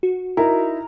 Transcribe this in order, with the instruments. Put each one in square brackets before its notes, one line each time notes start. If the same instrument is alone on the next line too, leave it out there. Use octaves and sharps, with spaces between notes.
[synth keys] F#4
[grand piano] D#4 E4 [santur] A#4